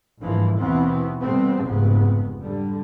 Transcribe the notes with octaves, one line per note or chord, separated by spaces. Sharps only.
G1 G#2 E3 F3 A#3
D#2 B2 E3 B3 C4
C3 G3 A3 B3 C4
F1 C#2 G#2 C3 B3
D3 G3